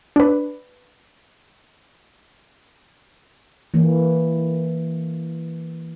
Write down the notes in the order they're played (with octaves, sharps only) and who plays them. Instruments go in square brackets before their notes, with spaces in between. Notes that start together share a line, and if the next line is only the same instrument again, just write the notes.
[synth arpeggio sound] D4 B4
[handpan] E3 A#3